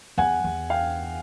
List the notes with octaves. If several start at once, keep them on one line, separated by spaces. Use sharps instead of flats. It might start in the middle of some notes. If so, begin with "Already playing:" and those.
E2 F#5 G#5
E2
F5 G5